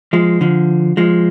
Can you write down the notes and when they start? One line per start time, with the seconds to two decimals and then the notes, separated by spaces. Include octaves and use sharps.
0.13 F3 G#3
0.41 D3 F3
0.97 F3 G#3